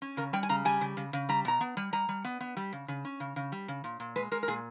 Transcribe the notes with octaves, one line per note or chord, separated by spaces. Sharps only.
C#4
C#3 A#4
G3 G5
G#5
C#3 A#5
G3 G#5
C#3
C#3
C#3
G3 A#5
B2 A#5
B3
G3
G3 A#5
G3
B3
B3
G3
C#3
C#3
C#4
C#3
C#3
G3
C#3
A#2
A#2
G#3 B4
G#3 A#4
A#4
A#2 G#4